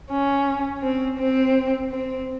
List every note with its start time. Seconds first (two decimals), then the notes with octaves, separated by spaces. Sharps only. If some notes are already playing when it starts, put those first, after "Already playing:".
0.10 C#4
0.82 C4
1.18 C4
1.91 C4